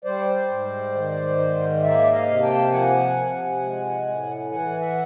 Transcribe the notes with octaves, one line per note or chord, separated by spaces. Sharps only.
G3 C5 D5
G#2
D#3
G#2
A#3 D5 E5
D#5 F5
C3
G5 A5
F3 F#5 G#5
C3
G#3
A2
E3 F#5 G#5
E5 F#5